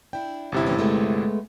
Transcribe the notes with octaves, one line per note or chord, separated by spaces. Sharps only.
D4 E4 G5
G1 C3 E4
E3 A3 C#4
G#3 A3 B3